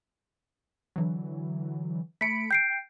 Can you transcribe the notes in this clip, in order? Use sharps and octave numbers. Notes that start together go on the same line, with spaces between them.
D3 E3 F#3
A3 B5 B6 C#7 D7
G5 G6 C7 D7